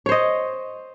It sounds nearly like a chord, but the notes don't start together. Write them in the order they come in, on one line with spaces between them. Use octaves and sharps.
C#5 C5 D#5